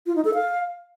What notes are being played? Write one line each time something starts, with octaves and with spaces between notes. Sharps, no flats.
F4
D#4
A4
F5